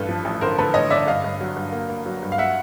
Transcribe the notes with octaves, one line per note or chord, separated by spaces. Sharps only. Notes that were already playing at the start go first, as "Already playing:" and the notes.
Already playing: A1 G2 A4 B4
F3
A1
D3 A#4 C5
D3 A4 B4
A1 C#5 D#5
D3 D5 E5
G2 D#5 F5
G2
F#3
G2
A#3
A#3
F#3
G2
F5
E5 F#5